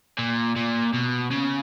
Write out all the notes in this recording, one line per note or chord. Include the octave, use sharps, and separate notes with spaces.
A#2
A#2
B2
C#3